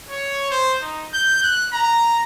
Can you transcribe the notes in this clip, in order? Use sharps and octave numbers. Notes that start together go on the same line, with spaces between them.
C#5
C5
D#4
G6
F#6
A#5